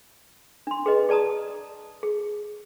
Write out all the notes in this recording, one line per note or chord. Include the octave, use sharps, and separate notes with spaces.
D4 C6
G#4 B4 D#5
G#4 D5 A5 A#5 D#6
G#4